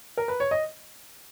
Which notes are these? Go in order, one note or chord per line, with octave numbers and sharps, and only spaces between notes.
A#4
B4
C#5
D#5